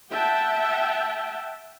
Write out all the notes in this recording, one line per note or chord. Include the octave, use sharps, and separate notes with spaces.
E5 F#5 G5 A5